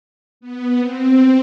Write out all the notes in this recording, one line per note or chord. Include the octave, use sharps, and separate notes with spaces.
B3
C4